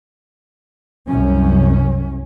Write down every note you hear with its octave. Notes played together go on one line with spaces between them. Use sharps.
C2 F#2 C#4